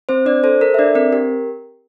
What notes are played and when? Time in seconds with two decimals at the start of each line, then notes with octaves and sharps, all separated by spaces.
0.09 C4 C5
0.26 D4 D5
0.44 A4 C5
0.61 A4 A#4
0.74 E5
0.79 D4 D5
0.95 C4 A#4
1.12 G4 A#4